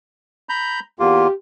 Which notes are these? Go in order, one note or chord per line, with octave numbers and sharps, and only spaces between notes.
A#5 B5 G6
E2 A#3 F4 G4